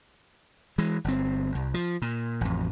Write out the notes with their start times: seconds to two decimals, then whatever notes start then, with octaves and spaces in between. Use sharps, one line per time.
0.78 E3 G#3
1.04 G1 C4
1.55 C2
1.74 F3
2.02 A#2
2.41 A1 F2